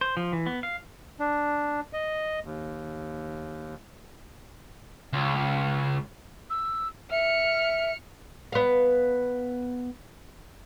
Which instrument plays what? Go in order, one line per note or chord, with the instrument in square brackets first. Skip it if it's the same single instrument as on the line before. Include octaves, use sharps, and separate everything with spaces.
[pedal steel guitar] C5
F3
E3
B3
F5
[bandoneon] D4
D#5
D#2
[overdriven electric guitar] C#2
[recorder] E6
[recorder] E5 [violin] F6 C#7
[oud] B3 F5